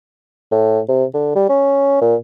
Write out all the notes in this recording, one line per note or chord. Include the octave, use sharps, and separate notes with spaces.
A2
C3
D3
G3
C#4
A#2